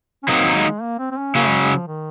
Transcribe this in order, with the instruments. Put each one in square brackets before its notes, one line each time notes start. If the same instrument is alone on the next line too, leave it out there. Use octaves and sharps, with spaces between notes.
[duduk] C#4
[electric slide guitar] D#3 F#3 A#3 D#4 [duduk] C4
[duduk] G#3
A#3
C4
C4
C#4
[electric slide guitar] C#3 F#3 C#4 [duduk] A#3
[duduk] G#3
G#3
F3
D#3